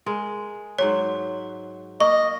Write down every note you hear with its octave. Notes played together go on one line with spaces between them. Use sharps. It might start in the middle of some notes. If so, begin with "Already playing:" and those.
G#3 A#4
G#2 F#3 C5 C#5
A#3 D#5 C#6